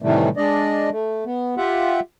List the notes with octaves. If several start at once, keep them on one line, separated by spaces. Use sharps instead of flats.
A2 C3 D#3 E3 G3 A3
G#3 D4 D5 D#5
A3
B3
F4 G4 E5 F#5